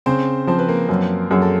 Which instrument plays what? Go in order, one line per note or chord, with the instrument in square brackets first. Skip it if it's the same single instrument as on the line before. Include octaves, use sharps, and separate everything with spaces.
[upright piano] C#3 [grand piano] C4 C5
[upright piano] F3 [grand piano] C4 C5
[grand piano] B4
A#3 A#4
[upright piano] F#2
[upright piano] F#2 [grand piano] G#4
[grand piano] A4